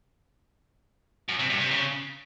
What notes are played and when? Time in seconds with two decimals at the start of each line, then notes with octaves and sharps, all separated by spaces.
1.28 F#2
1.39 C3
1.50 G2
1.60 C3
1.71 C#3